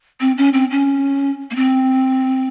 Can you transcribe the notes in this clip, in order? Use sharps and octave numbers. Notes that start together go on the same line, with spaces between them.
C4
C#4
C4
C#4
A#3
C4